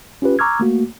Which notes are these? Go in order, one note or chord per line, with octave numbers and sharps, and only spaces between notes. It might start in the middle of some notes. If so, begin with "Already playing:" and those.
C#4 F4 G4 B4
A#5 C#6 D6 E6 F6 G#6
A3 A#3 F#4